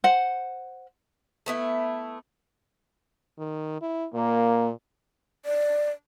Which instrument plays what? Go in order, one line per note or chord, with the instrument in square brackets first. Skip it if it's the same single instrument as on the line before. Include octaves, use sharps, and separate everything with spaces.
[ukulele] C5 F#5
[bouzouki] A3 B3 E4
[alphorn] D#3
E4
[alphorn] A#2 [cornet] A#3
[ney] D5